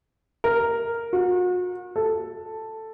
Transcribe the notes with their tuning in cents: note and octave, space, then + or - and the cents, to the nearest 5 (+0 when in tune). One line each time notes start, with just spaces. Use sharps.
A#4 -5
F#4 -40
A4 +5